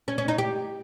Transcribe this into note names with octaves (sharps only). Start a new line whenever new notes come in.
C#4
C#4
D#4
G4